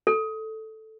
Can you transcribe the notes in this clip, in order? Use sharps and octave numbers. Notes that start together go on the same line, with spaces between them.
A4